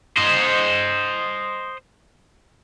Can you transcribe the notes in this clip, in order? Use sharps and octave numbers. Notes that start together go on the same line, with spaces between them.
C5 D#5